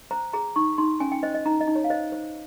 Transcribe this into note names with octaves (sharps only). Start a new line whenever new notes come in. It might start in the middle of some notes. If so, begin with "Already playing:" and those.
C5 A#5
G#4 A#5
D#4 C#6
D#4 C6
C#4 G#5
G5
C5 D#5
D#5
D#4 A#5
D#5
D#4
C#5
F5
C5 D#5
C5